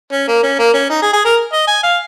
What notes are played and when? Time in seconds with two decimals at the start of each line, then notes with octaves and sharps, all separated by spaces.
0.12 C#4
0.28 A#3
0.43 C#4
0.59 A#3
0.74 C#4
0.90 D#4
1.02 G#4
1.13 G#4
1.25 A#4
1.53 D#5
1.68 G#5
1.83 F5